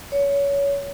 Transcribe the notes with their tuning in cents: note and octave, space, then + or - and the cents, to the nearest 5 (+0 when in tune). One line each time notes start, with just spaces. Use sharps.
C#5 +25